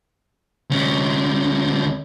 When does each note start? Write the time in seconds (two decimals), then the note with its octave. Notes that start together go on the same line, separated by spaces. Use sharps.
0.70 D2 C#4